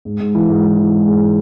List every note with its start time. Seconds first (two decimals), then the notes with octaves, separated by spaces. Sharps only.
0.05 G#2
0.20 G#2
0.35 E3
0.49 G#2
0.64 E3
0.78 E3
0.92 G#3
1.07 G#2
1.21 E3